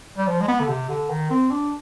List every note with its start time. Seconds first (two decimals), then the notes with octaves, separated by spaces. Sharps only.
0.18 G3
0.27 F3
0.41 G#3
0.48 B3
0.60 D3
0.68 C3
0.89 D3
1.10 D#3
1.31 C4
1.51 D4